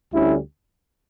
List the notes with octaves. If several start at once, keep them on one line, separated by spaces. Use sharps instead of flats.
D2 D3 G3 C#4 E4